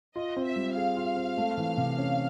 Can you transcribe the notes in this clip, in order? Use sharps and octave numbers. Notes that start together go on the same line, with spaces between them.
F4 D#5
C4
E5
G3
G#4 F5
F4
C4
A3
E3
C3
C#4